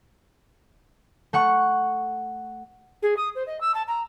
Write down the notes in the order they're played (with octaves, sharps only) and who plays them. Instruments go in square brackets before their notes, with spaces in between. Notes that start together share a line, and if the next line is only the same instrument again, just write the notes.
[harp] A3 F#5 C#6
[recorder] G#4
D#6
C5
D#5
E6
A5
A#5